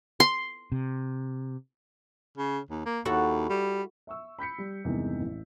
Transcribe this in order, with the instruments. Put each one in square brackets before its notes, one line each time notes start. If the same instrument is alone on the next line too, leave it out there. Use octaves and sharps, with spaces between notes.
[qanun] C6
[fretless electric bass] C3
[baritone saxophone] C#3
D#2
A#3
[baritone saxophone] D#2 [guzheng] E4 F#4 A4
[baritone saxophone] G3
[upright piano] E5 C#6 E6
B5 G6 B6 C#7
G3
E2 G2 C3 D#3 G#3 D#4
A1